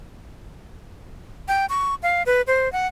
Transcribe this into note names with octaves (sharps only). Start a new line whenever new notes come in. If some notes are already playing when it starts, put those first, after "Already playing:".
G5
C#6
F5
B4
C5
F#5